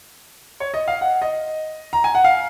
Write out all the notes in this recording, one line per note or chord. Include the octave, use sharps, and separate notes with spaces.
C#5
D#5
F5
F#5
D#5
A#5
G#5
F#5
F5